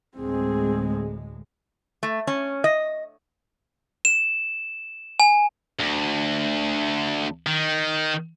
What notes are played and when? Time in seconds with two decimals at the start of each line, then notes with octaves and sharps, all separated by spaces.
0.18 D2 A2 G#3 C4 G#4
2.03 A3
2.27 C#4
2.64 D#5
4.05 E7
5.20 G#5
5.79 D2
7.46 D#3